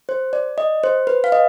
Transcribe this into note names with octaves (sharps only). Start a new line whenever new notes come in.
C5
D5
D#5
C5
B4
F5
D#5